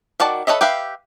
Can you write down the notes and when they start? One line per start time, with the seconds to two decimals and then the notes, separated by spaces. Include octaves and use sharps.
0.20 D#3 F#4 D5 A5
0.47 A4 B4 C#5 D#5 E5
0.61 G4 B4 E5 F5